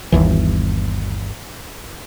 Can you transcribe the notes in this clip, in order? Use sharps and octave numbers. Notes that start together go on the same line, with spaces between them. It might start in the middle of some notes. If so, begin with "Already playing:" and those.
G1 D#2 E3